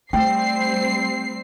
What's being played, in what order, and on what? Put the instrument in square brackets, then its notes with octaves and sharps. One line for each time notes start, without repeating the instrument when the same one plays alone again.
[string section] G3 C4 C7 [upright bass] A3 [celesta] G5